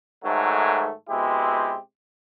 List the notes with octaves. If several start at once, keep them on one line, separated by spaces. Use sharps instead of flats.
G#2 D#3 F#3 A3
B2 G#3 C4 E4 G4